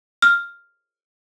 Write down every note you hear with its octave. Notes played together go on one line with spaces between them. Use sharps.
F6